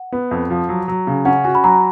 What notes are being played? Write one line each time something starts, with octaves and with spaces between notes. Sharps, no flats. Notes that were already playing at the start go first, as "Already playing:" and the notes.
Already playing: F#5
B3
F2
F3
F#3
F#3
C#3
C#4 F#5
F#4 G#5
B5
F#3 A#5